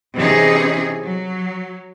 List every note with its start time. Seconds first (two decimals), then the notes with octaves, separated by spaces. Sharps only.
0.15 C3 E3 C#4 D#4 G#4
1.03 F#3